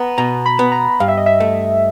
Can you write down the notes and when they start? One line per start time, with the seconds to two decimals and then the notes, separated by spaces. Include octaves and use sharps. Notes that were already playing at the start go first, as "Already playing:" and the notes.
Already playing: B3 A#5
0.18 B2 A#5
0.46 B5
0.59 B3
0.72 A#5
1.00 G2 F5
1.08 E5
1.17 D#5
1.26 E5
1.40 A3